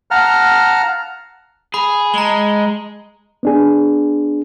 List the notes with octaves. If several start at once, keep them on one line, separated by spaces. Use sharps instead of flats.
F5 F#5 A5 A#5 F6
G#4 B5
G#3 A#5 G7
A5
B3 D4 G#4